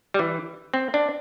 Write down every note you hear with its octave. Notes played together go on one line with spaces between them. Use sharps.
G3
E3
C4
D4